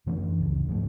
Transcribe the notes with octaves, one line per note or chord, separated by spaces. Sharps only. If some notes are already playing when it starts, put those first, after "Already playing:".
F#2 E3 A3 D4
D1 C#2
G#2 F3 A3